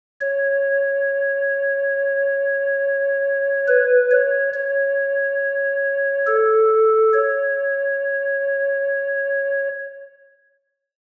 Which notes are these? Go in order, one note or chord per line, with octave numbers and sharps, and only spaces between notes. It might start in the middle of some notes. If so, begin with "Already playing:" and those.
C#5
B4
C#5
C#5
A4
C#5